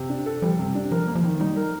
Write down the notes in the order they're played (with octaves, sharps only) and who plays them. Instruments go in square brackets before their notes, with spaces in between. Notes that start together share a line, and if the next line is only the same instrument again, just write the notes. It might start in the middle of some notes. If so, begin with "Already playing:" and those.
Already playing: [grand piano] C3
D4
A4
[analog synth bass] F3 [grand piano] G3
[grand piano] C3
D4
[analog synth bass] F3 [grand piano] A#4
[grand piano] A#3
[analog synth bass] F3
[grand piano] D#3
[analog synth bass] G3 [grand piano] D#4
[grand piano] A#4
[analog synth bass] F3